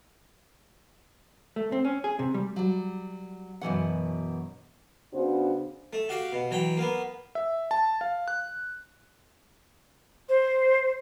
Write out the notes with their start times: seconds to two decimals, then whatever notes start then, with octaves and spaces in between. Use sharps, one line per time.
1.56 A3
1.72 C4
1.85 C#4
2.04 G#4
2.19 C3
2.34 G3
2.56 F#3 G3
3.61 F#2 B2 E3 F#5
5.14 C#3 B3 D4 F#4 C5
5.93 A3
6.09 F#4 G4 F5
6.32 B2
6.51 E3 F#3 G5
6.77 A#3 B3
7.35 E5
7.71 A5
8.01 F5
8.28 F#6
10.29 C5